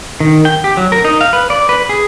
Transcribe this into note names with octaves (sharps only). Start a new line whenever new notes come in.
D#3
G5
G4
F#3
A#4
D#4
F5
B4
D5
B4
G#4